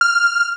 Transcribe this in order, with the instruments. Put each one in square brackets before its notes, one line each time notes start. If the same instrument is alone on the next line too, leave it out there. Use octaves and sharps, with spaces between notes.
[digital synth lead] F6